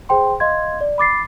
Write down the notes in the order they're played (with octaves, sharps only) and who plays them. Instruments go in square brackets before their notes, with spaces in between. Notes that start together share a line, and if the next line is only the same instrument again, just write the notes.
[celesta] G#4 C5 G5 C6
D#5 F5 C6 G#6
D5
B5 D6 A6 C7